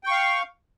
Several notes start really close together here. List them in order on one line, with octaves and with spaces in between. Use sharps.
G5 C#6 F5